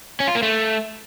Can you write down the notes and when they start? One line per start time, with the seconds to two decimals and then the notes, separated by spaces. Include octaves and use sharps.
0.20 C#4
0.28 F4
0.35 A#3
0.43 A3